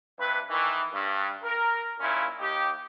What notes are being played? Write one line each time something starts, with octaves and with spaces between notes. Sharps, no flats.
G2 C3 B4
D#3 E3
G2
A#4
D#2 A#2 C#4 E4 F4
D#2 D#4 G4